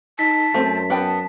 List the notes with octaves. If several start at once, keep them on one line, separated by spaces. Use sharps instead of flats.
D#4 A5 B6
F#2 A3 C4
B3 G5 A5